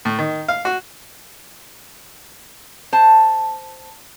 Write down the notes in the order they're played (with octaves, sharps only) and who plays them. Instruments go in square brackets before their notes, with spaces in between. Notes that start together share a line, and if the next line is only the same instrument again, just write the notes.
[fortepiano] A2
D#3
F5
F#4
[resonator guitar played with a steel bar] C5 A5